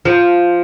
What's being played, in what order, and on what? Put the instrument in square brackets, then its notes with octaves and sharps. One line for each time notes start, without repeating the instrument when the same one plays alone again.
[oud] F3